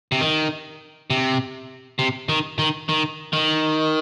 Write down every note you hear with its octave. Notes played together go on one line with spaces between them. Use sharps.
C3
D#3
C3
C3
D#3
D#3
D#3
D#3